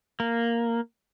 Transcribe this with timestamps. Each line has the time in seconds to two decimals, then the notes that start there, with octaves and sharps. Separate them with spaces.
0.20 A#3